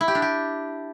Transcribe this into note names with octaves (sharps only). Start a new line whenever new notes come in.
E4
G4
D4
G4